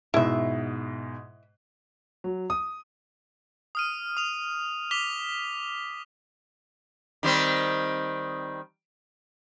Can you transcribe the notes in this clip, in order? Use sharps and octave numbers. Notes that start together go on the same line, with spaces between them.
G#2 B2 E4 E5
F#3
D#6
D#6 F6 D#7
D#6 F7
D6 B6 F7 G7
D#3 G3 C4